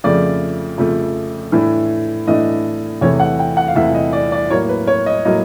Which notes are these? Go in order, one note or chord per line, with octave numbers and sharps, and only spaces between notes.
F2 C#3 F3 A3 D5
F2 C#3 F3 A3
A2 E3 A3 D4
A2 E3 A3 D4 D#5
E2 C3 E3 A3 C#5
F#5
G5
F#5
F5
E2 C3 E3 A3 E5
D#5
D5
D5
A2 F#3 A#3 C#5
B4
C#5
D#5
A2 F#3 A#3 D#5